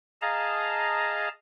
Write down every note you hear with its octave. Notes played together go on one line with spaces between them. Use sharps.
G#4 D#5 F5 A5 A#5